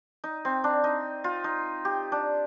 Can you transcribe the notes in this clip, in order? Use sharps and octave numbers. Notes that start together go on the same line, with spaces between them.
D#4
C4
D4
D#4
F4
D#4
G4
D4